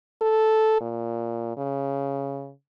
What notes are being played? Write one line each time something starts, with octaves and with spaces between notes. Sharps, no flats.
A4
A#2
C#3